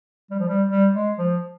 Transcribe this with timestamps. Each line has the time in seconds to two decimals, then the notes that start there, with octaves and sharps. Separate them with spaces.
0.31 G3
0.39 F3
0.48 G3
0.68 G3
0.93 G#3
1.18 F3